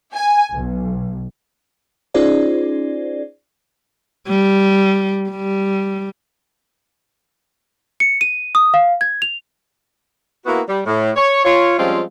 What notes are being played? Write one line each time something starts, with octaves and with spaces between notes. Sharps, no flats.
G#5
B1
C#4 D#4 F4 G#4 C5 D5
G3
G3
C#7
D#7
D#6
F5
G#6
F7
A#3 B3 E4 F#4
G3
A2
C#5
F4 C#5
F3 G3 G#3 C4 C#4 F4